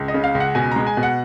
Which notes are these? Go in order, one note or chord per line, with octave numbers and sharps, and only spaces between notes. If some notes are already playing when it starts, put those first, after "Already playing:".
Already playing: C#2
D#5
C#3
F5
C#2
F#5
B2 G#5
G#3 A#5
G#5
B2
F#5